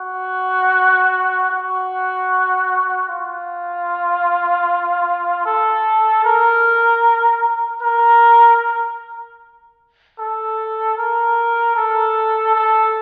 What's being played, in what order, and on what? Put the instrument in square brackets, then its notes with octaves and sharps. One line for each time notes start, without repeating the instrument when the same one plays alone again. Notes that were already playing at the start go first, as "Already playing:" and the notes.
Already playing: [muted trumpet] F#4
F#4
F4
A4
A#4
A#4
A4
A#4
A4
A4